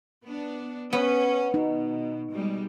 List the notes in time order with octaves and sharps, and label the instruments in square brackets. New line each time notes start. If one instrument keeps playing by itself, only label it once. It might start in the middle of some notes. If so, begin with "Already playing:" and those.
[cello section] B3 D4
[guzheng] B3 [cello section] C#4
[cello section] B2 [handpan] D#4
[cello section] B2 G3 G#3